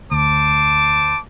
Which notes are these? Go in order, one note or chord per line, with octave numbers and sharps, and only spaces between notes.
D2 C5 A5 D6